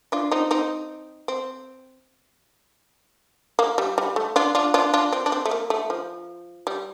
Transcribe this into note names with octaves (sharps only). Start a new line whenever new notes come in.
D4 F4
C4 D#4
C4 D#4
C4
A#3
G3
G3
A3
D4 F4
D4 F4
D4 F4
D4 F4
C4
D4
C4
A3
A#3
A3
F3
G3